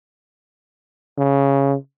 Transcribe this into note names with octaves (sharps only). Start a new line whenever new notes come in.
C#3